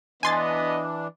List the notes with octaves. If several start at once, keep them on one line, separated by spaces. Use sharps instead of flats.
E3 B3 D4 D#5 G#5 C6 A6